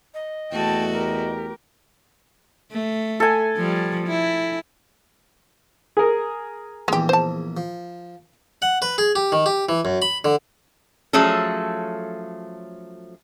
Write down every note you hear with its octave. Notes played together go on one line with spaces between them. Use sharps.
D#5
E2 A3 F#4 G5 A5
G4 A#4
A3
A4 G#5
F3 G3
E4
G#4 A#4
A#1 E2 G#3 G4
C5 A5
F3
F#5
B4
G#4
G4
D#3
G4
E3
F#2
B5
D3
F3 F#3 A3 C#4 G#4 A4